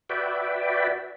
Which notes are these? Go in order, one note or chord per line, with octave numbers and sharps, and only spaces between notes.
F#4 B4 D5 E5 G5